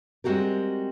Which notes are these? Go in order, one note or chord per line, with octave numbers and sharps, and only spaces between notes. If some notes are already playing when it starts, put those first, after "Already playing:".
G3 G#3 C4 F#4 G4 A#4